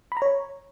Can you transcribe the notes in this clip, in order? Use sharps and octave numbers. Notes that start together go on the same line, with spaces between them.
B5
A#5
C#5